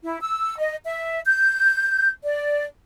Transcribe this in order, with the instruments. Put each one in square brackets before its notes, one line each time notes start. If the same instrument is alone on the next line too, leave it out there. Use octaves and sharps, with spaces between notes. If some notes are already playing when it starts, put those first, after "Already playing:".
[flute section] E4
E6
D#5
E5
G6
D5